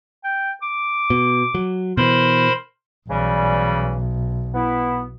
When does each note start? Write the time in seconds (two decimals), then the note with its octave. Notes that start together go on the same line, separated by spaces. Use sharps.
0.24 G5
0.62 D6
1.10 B2
1.55 F#3
1.97 B2 E3 A#4 C5 B5 C6
3.09 B1 C#3 E3 G3
4.54 B3 E4